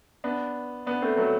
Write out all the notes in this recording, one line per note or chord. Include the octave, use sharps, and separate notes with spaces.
B3 D4
B3 D4
A3 C4
F#3 A3